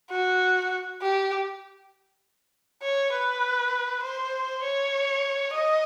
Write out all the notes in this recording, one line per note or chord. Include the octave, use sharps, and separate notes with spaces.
F#4
G4
C#5
B4
C5
C#5
D#5